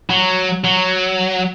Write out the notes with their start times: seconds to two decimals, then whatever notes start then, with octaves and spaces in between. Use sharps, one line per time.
0.10 F#3
0.64 F#3